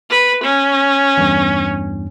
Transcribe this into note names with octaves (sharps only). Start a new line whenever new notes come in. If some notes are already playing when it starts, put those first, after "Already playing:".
B4
C#4
E2 G2